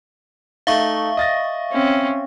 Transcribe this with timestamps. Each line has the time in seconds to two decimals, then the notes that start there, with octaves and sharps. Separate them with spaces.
0.67 A3 D#4 E5 F5 C#6
1.17 D#5 A6 A#6
1.72 C4 C#4